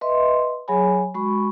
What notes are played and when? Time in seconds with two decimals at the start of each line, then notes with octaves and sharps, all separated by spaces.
0.01 B4 D#5 E5 C6
0.68 F#3 G#4 C#5 G#5 B5
1.14 G#3 F#4 B5 C#6